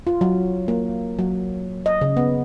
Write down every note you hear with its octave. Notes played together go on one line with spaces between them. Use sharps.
F4
F#3
A#3
F#3
D#5
C#3
B3